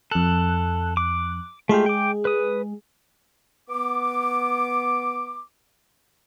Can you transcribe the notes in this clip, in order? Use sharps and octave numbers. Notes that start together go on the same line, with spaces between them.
F2 A4 F#6
D6
G#3 A3 F4 G4 G#4
G5 D6
B4 D#6
B3 D6